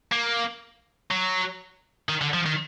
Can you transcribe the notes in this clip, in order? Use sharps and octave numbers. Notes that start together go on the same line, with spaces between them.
A#3
F#3
D#3
D3
F3
D#3